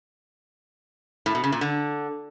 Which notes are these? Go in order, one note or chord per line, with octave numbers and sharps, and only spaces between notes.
A2
B2
C#3
A#2
D3